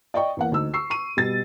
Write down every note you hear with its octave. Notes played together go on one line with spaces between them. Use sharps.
D5 D#5 G5 C#6
E2 A#3 F#5
D2 D#4 E6
C#6 E6 C7
C#6 D#7
B2 G3 A6